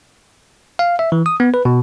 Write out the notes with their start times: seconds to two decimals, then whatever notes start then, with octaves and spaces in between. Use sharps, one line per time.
0.79 F5
0.99 E5
1.12 E3
1.26 D#6
1.40 B3
1.54 B4
1.65 B2